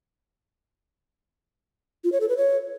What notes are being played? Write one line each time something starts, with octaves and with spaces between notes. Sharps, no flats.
F4
C#5
A4
B4
C#5